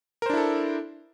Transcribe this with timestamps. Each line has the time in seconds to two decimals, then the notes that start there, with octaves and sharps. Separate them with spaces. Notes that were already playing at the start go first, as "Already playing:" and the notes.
0.22 A#4
0.26 C5
0.30 D4
0.33 E4
0.37 A4